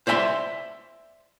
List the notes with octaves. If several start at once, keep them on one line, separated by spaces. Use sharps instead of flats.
C5 D5 E5 G#5 C6